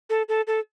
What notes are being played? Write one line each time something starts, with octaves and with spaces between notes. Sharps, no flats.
A4
A4
A4